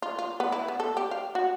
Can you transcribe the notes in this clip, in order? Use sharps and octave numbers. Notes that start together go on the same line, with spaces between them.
F4
F4
B3
E4
B3
A4
G4
F5
F#4